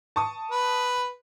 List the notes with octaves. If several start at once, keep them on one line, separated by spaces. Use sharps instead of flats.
A5 C#6 D#6
B4